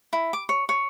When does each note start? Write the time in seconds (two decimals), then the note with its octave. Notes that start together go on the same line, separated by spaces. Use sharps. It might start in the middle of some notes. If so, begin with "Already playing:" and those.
0.13 E4
0.33 D6
0.49 C#5
0.69 C#5